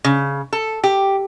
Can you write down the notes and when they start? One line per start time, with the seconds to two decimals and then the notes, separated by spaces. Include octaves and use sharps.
0.05 C#3
0.53 A4
0.84 G4